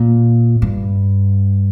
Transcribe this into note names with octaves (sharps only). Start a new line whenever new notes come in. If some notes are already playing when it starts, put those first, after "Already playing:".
Already playing: A#2
G2